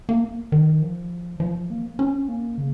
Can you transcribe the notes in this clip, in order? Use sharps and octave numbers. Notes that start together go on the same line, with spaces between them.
A#3
D#3
F3
F3
A#3
C#4
A#3
C#3